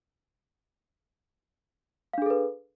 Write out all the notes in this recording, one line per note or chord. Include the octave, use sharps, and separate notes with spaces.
D4 G#4 A4 B4 F5